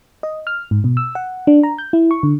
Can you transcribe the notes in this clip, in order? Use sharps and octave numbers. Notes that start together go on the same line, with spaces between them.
D#5
F6
G#2
B2
E6
F#5
D4
A#5
G6
E4
C#6
D3